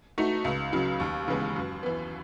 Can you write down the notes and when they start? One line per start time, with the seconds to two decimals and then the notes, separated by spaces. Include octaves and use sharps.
0.18 A3 D#4 F#4
0.44 C#2
0.73 C#3 F#3
1.00 D#2
1.28 C#3 E3 G#3 B3
1.56 F#2
1.83 E3 B3